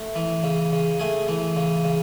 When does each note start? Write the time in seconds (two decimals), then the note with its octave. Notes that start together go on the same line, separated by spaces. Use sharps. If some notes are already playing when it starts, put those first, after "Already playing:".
Already playing: A3
0.16 E3
0.43 C#3
0.72 C#3
1.00 A3 G#4
1.28 E3
1.57 C#3
1.84 C#3